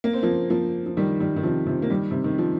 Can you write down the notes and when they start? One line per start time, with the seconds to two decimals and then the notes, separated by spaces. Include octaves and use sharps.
0.04 A#3
0.13 C4
0.23 F3 A#3
0.50 F3 A#3
0.86 F3
0.97 D#3 G3
1.20 D#3 G3
1.36 D#3
1.43 C3 F3
1.67 C3 F3
1.82 A#3
1.90 D#3 G3
2.11 C3
2.24 D#3
2.38 F3